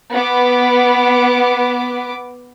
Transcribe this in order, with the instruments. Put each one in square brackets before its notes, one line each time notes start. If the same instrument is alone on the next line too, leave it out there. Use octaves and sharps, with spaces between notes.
[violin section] B3 D6